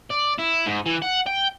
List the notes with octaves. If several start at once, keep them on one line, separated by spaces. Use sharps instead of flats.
D5
E4
G#2
E3
F#5
G5